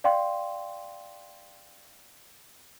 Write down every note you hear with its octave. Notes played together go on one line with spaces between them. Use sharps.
D5 F5 G5 C6